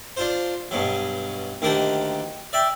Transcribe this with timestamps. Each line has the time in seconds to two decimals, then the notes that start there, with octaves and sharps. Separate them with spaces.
0.17 D4 F4 C5
0.71 G2 B2 F#3
1.62 D2 D#3 A#3 G4 F#5 A5
2.53 D5 E5 G5